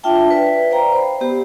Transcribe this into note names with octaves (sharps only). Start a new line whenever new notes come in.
D4 F4 E5 G5 A5
B4 D5 E5
C5 D5 F5 G5 A#5
C5 B5
B3 G4 C5